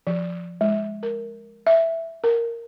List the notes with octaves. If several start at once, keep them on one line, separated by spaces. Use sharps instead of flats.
F3
G#3
A#4
E5
A#4